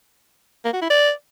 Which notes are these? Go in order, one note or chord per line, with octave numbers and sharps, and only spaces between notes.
A#3
F#4
E4
D5